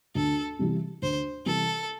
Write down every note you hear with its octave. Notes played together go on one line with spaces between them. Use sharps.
D2 A4
C3 E3 G3 E4
D2 C5
C3 E3 G3 E4 A4